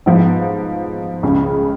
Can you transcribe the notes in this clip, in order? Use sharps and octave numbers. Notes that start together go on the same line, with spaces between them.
G#2 F3 B3
C#2 C#3 G#3 C#4